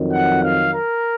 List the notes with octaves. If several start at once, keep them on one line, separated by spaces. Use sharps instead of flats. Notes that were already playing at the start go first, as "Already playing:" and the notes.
Already playing: F2 D#3 F#3
F#5
F5
A#4